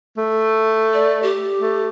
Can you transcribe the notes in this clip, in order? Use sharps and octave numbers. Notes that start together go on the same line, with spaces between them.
A3
D5
G4
A3